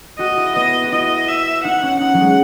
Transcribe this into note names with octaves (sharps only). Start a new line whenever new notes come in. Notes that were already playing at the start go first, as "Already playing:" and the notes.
F#4 D#5
E4
B3 D#5
F#4
E4 D#5
E5
D#4 F#5
C#4
D#4 F#5
F#3
G#3